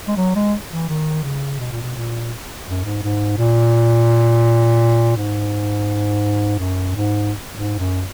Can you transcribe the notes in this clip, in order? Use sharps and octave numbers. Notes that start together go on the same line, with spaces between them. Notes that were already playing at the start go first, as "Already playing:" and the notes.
G#3
F#3
G#3
E3
D#3
C#3
B2
A#2
B2
A#2
F#2
G#2
G#2
A#2
G#2
F#2
G#2
G#2
F#2